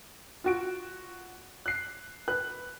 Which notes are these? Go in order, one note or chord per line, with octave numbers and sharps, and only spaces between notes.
F4 F#4 D7
F#6 C7
B4 F#6